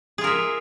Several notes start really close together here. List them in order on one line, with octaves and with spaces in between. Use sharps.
G#4 F4 A#4 E5